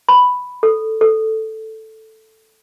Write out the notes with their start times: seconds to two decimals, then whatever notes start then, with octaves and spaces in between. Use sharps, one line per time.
0.09 B5
0.63 A4
1.01 A4